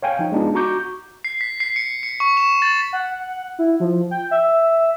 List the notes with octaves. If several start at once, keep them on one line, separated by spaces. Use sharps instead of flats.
C#5 F5 G5 G#5
F3 D#4
G#3 B3 D4 D#4 F4
F#4 A#5 C#6 D6 G6
C7
B6
C7
C#7
C#7
C#6
E7
A6
F#5
E4
F3
G5
E5